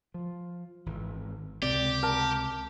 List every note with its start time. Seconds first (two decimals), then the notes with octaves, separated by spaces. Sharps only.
0.14 F3
0.86 G#1 E3
1.62 C#2 C3 C4 G4 D5
2.03 A#4 A5